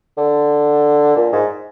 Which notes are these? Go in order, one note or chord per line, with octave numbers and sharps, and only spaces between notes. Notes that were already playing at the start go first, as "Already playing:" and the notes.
D3
A#2
G#2